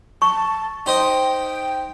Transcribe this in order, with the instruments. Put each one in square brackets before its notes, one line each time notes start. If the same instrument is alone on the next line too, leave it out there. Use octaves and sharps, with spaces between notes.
[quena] A5 [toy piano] C#6
[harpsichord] D#4 C5 D#5 [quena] G5